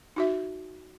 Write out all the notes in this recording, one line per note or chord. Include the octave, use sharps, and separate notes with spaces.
D#4 F#4 E5